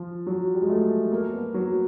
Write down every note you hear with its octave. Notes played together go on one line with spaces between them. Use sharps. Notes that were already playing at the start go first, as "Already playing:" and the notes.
Already playing: F3
F#3
G3
G#3
A3
A#3
B3
F#3